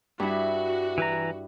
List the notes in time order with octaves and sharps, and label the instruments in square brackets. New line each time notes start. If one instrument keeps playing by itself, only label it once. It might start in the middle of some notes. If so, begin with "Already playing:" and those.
[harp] G2 E4 [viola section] F#4
[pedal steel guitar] E3 B4 A#5